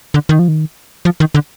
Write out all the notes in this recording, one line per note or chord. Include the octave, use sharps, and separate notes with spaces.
D3
D#3
F3
D#3
F3
D#3
D3